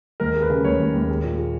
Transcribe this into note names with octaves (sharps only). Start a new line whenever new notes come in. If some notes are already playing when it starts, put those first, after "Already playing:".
D#2 A#4
G#3
B4
C#3
D#2 C#5
D#2
D#2
G#3
A#2
G#3